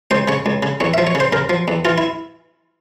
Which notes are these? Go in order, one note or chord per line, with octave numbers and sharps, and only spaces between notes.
C#2 C5
C#3 C#5
C#2
C#3
E2 C#5
E5
F3
C#5
C#3
C5
C#3 A#4
F3
E2
E3 F4
E4